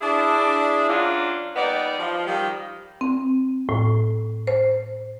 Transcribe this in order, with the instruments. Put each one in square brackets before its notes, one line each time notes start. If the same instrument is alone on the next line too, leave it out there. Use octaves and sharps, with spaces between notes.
[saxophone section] D4 E4 G#4
F#3 A#3 C#4 D4 F4
G3 A#3 B3 D#4 B4 D5
F3
D#3 F3 G3
[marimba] C4
A2
C5